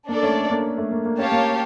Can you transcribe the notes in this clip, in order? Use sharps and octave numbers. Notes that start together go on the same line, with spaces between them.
A#3 D4 A4 D5
A3 C#4
A#3 D4
A3
A#3
A#3
C#4 G4 C#5 F5 A5
A#3